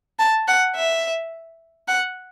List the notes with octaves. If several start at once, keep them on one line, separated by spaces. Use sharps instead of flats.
A5
F#5
E5
F#5